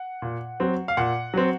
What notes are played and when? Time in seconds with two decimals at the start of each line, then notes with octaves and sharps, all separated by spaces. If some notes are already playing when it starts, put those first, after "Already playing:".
Already playing: F#5
0.22 A#2
0.60 F#3 C4
0.88 F5
0.97 A#2 F#5
1.34 F#3 C4